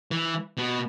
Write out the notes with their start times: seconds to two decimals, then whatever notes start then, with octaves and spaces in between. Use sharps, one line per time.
0.11 E3
0.57 B2